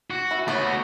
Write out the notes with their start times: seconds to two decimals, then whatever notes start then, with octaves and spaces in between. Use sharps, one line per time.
0.10 F#4
0.31 E3
0.48 A3 B3 F#4 C#5